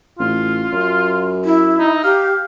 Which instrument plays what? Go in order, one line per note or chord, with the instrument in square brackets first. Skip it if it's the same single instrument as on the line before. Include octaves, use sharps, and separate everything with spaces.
[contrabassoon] A1 [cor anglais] F4
[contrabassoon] F#2
[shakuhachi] E4
[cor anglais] D#4
[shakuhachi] G4 [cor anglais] F5